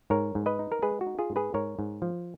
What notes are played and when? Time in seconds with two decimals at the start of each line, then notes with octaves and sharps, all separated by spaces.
0.10 G#2 A#4 C#5
0.35 G#2
0.46 B4 D#5
0.59 D#4
0.72 A#4
0.82 G#3 G#4 B4
1.01 F#4
1.07 D#4
1.19 F4 G#4
1.30 G#2
1.36 G#4 B4
1.54 G#2 A#4 C#5
1.79 G#2
2.02 F3